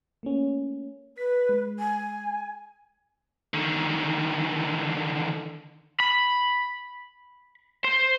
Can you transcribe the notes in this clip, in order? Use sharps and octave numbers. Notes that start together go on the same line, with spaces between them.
A3 A#3 C#4
B4 B6
G#3
G#5
D3 D#3
B5
C5